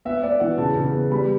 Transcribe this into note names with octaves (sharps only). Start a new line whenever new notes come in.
B3 E5
B3 D5
E3 F#5
C#3 A5
C#3
B3
G3 B5